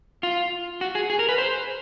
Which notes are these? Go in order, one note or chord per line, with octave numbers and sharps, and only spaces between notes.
F4
F#4
G#4
G#4
A#4
B4
C5